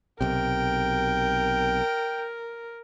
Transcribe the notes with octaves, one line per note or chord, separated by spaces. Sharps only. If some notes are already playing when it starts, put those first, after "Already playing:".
B1 C3 A#4 G5